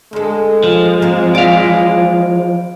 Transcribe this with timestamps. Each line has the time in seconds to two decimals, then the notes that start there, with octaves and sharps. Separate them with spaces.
0.13 D2 G#3 A4
0.63 F3
1.02 A#3 C4
1.35 E3 D5 F5